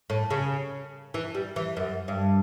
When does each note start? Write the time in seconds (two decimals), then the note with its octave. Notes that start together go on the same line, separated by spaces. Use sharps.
0.10 A2
0.30 C#3
1.14 E3
1.35 G3
1.56 E3
1.77 F#2
2.08 G2